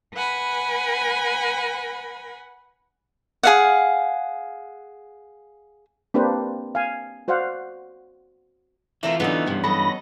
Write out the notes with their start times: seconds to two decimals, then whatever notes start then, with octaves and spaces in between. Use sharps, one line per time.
0.14 B4 F#5 G#5 B5
3.43 G#4 F5 F#5
6.14 A#3 C4 D4 G4 B4 C5
6.75 F5 G#5
7.28 F#4 C5 D5 F5 F#5
9.03 E3 A3 C4 F4 A#4
9.20 D3 A3 B3 C#4 D#4
9.46 G2 C3 E3 F3
9.64 F#3 A4 D#5 B5 A#6